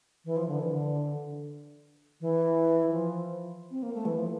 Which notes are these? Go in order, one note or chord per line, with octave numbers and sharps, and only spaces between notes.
E3
F3
D3
E3
D3
E3
F3
C4
A#3
A3
E3
F3